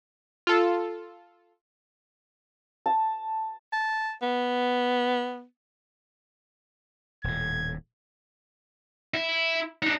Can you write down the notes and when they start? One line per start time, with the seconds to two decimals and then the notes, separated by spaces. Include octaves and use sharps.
0.47 F4 A4
2.86 A5
3.73 A5
4.22 B3
7.24 D#1 A2 G#6
9.14 E4
9.82 D4 D#4